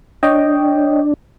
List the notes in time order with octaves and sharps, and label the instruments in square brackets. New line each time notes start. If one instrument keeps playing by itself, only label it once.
[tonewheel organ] D4 [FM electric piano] C#5 D#5 G5